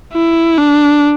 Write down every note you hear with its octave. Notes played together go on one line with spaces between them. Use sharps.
E4
D4